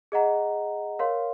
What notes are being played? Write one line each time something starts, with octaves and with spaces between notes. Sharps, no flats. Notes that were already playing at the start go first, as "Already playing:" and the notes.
G#4 D#5 F#5 A#5
A#4 C#5 F5 C6